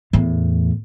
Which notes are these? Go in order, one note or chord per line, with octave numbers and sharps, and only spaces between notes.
E2 A2